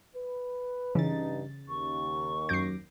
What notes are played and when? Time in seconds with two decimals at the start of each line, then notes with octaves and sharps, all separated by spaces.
0.15 B4
0.95 G2 C#3 E3 D#4 A6
1.68 D#2 C#6
2.49 F#2 D6 G6 A#6 C7